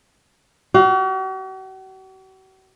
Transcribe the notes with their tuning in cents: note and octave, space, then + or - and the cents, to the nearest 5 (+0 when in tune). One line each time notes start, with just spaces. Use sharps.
F#4 +45 F5 +10